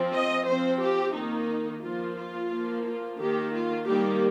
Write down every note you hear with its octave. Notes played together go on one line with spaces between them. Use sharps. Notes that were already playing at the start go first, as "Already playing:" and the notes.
Already playing: F3 C4
D#5
F3 C4 C5
G4
D#3 A#3 D#4
F3 A#3 F4
F4
F3 A#3
F4
D#3 A#3 G4
F4
D#3 G3 A#3 G4